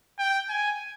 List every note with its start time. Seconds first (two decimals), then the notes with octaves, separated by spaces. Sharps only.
0.19 G5
0.49 G#5